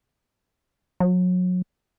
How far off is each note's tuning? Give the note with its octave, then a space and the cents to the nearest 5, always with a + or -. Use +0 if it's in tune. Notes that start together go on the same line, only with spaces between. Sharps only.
F#3 -30